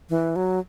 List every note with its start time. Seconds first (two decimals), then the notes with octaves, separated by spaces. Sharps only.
0.10 E3
0.36 F#3